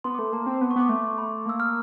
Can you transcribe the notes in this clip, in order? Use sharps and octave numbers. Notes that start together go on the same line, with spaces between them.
B3 C6
D6
A3
A#3 A5
C4
B3
C#6
B3 D6
A3 C#6
B5
A#3 E6
F6